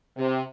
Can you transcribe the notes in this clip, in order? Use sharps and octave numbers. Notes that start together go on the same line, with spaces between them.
C3